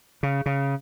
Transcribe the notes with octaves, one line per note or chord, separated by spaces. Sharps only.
C#3
C#3